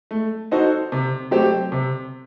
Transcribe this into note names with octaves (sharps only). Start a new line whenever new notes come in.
A3
D#4 F#4 A4 C5
C3
F#3 A3 C4 G4
C3